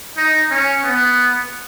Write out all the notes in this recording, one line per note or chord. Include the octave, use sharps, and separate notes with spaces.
D#4
C#4
B3